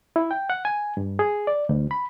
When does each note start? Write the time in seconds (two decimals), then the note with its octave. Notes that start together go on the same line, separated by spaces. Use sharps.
0.16 E4
0.31 G5
0.50 F#5
0.65 G#5
0.97 G2
1.19 G#4
1.47 D5
1.69 D2
1.91 B5